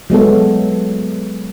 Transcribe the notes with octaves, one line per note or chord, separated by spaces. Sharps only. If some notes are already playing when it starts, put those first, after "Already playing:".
F#3 G#3 B3 A4